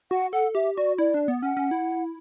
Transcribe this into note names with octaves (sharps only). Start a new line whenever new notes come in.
F#4 F#5
A4 F#5
G4 E5
F#4 D5
E4 D5
D4
B3
C#4 F#5
C#4
E4